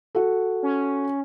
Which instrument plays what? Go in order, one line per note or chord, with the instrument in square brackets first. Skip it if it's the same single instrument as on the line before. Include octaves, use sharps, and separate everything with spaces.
[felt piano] F#4 A4
[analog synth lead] C#4